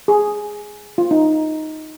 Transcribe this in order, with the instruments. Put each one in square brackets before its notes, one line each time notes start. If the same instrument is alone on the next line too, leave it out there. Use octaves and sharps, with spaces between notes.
[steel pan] G#4
F4
D#4